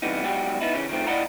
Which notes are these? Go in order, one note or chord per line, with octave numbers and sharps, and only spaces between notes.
C3 E3 G3 B3 D#4
G#2 B2 F#3 G3 F#4 G4
B3 D#4 E4
C#3 E3 C#4
D#3 F3 A3 C4
D#2 E4 D5 D#5 F#5 A#5